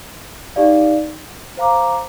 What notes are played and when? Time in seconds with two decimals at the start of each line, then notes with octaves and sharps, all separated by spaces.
0.56 D#4 G4 D5 F5
1.57 C5 F5 A#5 D6